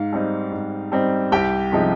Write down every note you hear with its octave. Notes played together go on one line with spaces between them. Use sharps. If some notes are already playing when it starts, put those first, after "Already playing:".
Already playing: G#2 F5
G3 C4 D#4
G#2
G3 C4 D#4
C2 G4 G5
C3 F3 G#3 D#4